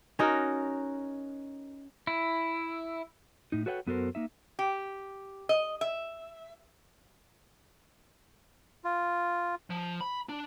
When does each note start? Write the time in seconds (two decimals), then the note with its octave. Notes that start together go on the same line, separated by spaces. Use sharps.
0.19 C#4 D#4 F#4 A#4
2.07 E4
3.52 A2 D#4
3.66 F#4 A4 B4 C#5 F#5 G5
3.87 F#2 B3 F#4 A4 A#4 C5
4.15 A#3 D#4 E5
4.59 G4
5.49 D#5
5.81 E5
8.84 F4
9.70 F3
10.01 B5
10.29 D4